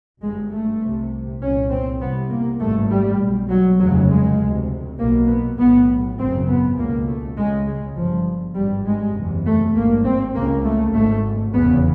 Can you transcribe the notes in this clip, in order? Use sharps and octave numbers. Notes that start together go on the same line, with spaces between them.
G1 G2 G#3
A3
C2 C3
C2 A#2 C#4
C4
C2 C3 B3
A#3
G#1 G2 A3
G3
B1 B2
F#3
F1 D#2 C#3 F#3
G#3
D2
C3
B1 B2 A#3
B3
B1 A2 B3
G#1 F#2 C#3 C4
B3
C#2 B2 A#3
A3
C#2 C#3 G#3
G#3
G1 G2 F3
G#1 G2 G3
G#3
F#1 E2 C3
A3
G#1 G2 A#3
C4
C#2 C#3 A#3
A3
G#1 G#2 A3
F1 E2 C#3 B3